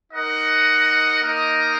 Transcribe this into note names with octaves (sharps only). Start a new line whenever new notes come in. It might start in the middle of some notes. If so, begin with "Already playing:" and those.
D#4 A#4 D#5 F#5
A#3 D#4 A#4 D#5